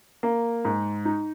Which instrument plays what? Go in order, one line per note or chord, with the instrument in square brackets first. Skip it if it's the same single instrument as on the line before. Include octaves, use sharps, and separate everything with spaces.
[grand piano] A#3
G#2
D#4